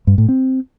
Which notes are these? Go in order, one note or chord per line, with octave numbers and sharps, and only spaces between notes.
G2
A2
C4